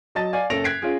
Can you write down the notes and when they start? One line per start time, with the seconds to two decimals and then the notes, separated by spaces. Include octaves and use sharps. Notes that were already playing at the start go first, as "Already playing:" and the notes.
0.15 F#3 D#5 A5 A6
0.33 D5 F5 G#5
0.50 F#1 C#4 A4 A#6 D7 F7
0.64 F#6 G#6 B6 C7 D7
0.82 C#4 F4 G#4